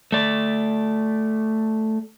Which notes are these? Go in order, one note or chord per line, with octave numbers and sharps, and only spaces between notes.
A3 D5